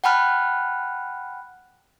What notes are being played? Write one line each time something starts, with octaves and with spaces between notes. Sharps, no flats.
F#5 G5 A5 B5 F6 F#6